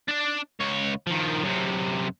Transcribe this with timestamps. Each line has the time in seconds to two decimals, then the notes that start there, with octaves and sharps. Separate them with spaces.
0.08 D4 D5
0.60 C#2 C#5
1.07 D#3 F3
1.44 F#2 C3